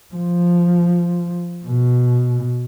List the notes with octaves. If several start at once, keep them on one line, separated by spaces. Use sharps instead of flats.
F3
B2